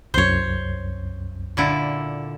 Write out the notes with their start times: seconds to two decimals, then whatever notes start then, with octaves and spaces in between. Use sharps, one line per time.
0.14 C2 F#2 C5 C#5
1.57 A#2 D3 E4